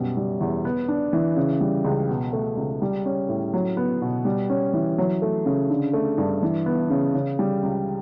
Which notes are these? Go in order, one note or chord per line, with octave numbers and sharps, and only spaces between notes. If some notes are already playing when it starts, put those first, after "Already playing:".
Already playing: F#2 B2 G3
G3
E2
B3
D4
E3
C#3
G3
C#2
B2
A3
C#2
G3
C#4
A2
F#3
B3
B2
G3
C#4
E3
F#3
A3
C#3
D3
A3
G2
E3
B3
C#3
C#3
G3
C#2